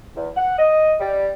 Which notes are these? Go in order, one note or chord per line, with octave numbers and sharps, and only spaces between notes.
E2
F#5
D#5
G3